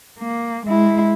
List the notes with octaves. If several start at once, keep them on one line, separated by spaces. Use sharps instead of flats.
A#3
G#3 E4